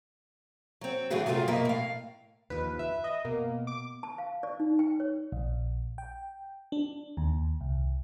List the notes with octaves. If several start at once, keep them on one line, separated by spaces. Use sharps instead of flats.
F#3 C4
A2 C#3 E3 A3 F#4 G#4
F#2 C3 F#3 A3 F4 G#4
B2 F3 A#3 A#4 E5
A2 F5
D#2 F3 B4
E5
D#5
B2 A#3
D6
A5
F5
D5
D#4
G5
C#5
A#1
G5
D4
D#2
C2